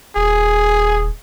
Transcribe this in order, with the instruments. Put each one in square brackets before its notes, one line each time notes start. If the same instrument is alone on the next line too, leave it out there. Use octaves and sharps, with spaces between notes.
[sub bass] D#1 [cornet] G#4